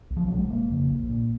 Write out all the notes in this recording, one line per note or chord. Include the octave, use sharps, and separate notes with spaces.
B1
F3
B2 F#3
G#3
F#1 A#3
F2 C#3
A#1
A#2